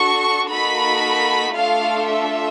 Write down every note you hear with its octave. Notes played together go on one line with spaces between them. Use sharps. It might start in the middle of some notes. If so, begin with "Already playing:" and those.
Already playing: D4 F#4 A4 C#6
A#3 D#4 F#4 A4 B5
A3 D4 F4 A4 F5
E5